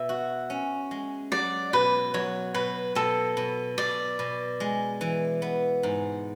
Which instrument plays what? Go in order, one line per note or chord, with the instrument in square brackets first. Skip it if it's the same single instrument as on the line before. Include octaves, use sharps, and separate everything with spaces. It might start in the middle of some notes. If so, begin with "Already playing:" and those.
Already playing: [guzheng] B2 [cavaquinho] E5
[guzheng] F#4
C#4
G#3
[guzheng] F#3 [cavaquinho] D5
[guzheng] B2 [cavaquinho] B4
[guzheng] F#3 [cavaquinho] C#5
[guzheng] B2 [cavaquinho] B4
[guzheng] B2 [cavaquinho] A4
[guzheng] B2
[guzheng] B2 [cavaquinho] D5
[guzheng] B2
G#3
E3
B3
G#2